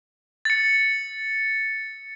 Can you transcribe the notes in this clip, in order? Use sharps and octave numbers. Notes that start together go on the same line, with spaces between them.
A6 C#7